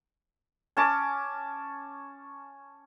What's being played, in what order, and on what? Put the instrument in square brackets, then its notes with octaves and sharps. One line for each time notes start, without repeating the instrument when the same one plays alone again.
[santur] C#4 A5 D6